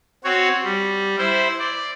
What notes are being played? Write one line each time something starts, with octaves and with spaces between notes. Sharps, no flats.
C4 F#4 C#5
G3
E4 C5
D5